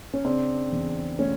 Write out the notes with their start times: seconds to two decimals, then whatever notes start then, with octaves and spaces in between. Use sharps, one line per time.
0.14 C#4
0.24 C#3 C4 D4
0.72 E2
1.19 A3 C#4